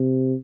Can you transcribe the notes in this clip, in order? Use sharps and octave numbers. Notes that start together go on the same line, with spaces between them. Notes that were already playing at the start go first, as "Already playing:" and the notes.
Already playing: C3